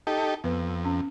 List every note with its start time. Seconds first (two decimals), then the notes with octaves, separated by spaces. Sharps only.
0.07 D#4 G4 A4
0.44 F2 B3 B4
0.85 C#4